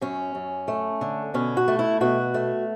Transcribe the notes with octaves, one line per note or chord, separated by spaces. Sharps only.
F#2 C#4
F#2
A3
D3
B2 C#4
F#4
A3
E4
B2 F#4
A3